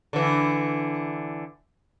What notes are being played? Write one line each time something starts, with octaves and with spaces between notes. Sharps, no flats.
D3 E3